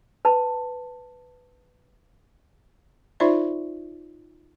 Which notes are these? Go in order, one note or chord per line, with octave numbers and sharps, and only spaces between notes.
B4 A5
D#4 F4 C5 D5 E5 C#6